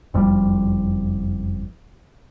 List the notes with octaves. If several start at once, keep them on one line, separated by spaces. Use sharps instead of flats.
F#1 F2 C#3 G3